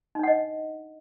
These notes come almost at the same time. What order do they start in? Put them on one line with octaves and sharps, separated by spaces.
D#4 D4 F#5 D#5